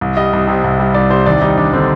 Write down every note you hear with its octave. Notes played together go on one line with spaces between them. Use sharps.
C2
G3 D#5
C2
C3
C2
G3
C2 D5
C3 C5
D#2 D5
G3 D#4
D#2 D4
D3 C4